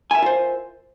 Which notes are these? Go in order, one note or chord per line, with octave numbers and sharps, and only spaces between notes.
F4 A#4 C5 E5 G#5